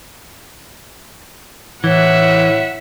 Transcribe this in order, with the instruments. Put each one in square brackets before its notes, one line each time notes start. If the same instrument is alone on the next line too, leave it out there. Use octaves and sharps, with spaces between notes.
[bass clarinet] A2 [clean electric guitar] E3 [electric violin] E5 F#5